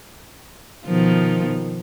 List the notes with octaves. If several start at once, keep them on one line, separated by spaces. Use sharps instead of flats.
B2 D#3 F3